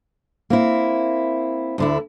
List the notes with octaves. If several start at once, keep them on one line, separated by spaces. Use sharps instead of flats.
A#3 C4 E4
D2 D3 E4